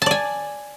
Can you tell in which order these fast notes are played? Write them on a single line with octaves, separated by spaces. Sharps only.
A5 D5 G#5